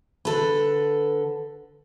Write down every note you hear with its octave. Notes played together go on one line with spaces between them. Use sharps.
D3 A4 B4